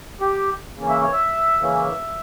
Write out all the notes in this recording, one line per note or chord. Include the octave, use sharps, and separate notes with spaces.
G4
C#3 E3 A#3 C#4
E5
C#5
E5
C#3 E3 A#3 C#4